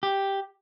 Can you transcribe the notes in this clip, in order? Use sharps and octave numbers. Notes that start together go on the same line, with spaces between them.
G4